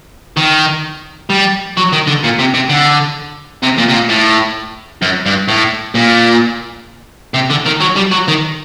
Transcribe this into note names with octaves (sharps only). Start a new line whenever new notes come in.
D#3
G3
F#3
D#3
D3
A#2
C3
C3
D3
C3
A#2
C3
A#2
A2
F#2
G2
A2
A#2
C3
D3
D#3
F#3
G3
F#3
D#3